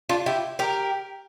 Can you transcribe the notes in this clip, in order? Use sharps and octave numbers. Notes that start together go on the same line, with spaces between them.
D4 F4
E4 G4
G4 A#4